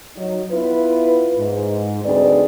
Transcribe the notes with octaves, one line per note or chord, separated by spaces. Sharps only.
F#3 D#4
B3 E4 F4 B4
G#2
D2 C4 D#4 G#4 B4 D5